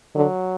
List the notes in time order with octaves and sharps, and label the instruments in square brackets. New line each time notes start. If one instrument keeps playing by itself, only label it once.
[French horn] D3 [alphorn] F#3